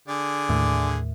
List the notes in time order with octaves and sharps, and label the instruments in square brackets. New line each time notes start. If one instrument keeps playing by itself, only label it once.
[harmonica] D3 G#4 D5
[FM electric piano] D#2 A2